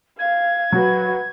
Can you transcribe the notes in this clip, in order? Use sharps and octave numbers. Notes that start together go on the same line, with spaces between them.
F5 G#6
F#3 F#4 B4